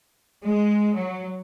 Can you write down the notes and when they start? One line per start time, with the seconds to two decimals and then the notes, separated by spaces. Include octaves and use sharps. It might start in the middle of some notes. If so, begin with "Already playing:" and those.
0.44 G#3
0.95 F#3